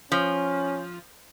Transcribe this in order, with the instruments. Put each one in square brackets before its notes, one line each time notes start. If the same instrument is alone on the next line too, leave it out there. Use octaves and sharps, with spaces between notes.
[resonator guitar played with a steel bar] F3 [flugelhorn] C#4